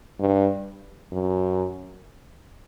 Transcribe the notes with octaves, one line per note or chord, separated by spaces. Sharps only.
G2
F#2